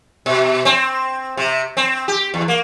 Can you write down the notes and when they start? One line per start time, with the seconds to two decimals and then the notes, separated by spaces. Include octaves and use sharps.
0.26 B2
0.65 C4
1.37 C3
1.77 C4
2.08 G4
2.34 E2
2.48 A#3